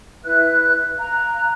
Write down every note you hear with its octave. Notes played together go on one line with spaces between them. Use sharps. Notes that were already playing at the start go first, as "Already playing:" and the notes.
E4 B4 E5 F#6
F5 A#5 F#6